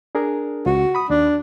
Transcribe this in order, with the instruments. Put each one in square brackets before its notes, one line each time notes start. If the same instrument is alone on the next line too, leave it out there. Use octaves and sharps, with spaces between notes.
[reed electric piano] D4 G#4 A#4
[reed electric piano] C#2 [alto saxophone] F#4
[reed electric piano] B5 D#6
[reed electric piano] D#2 [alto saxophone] D4